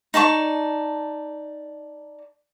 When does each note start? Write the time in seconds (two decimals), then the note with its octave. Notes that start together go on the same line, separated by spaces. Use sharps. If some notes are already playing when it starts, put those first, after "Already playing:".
0.14 D#4 D5 A5 C#6